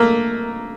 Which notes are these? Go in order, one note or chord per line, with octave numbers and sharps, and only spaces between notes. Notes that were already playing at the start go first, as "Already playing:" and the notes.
Already playing: A3 A#3